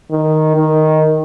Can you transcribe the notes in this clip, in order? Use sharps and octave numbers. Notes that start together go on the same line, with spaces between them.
D#3
D#3